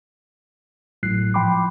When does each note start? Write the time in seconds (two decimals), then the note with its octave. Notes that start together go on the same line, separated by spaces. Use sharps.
1.03 G#1 A2 F#3 F#6 C7
1.34 G#2 F3 G5 B5 C6 D6